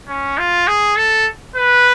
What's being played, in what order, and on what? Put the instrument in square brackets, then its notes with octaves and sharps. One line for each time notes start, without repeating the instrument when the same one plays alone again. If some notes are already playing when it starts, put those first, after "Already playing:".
[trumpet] C#4
F4
G#4
A4
B4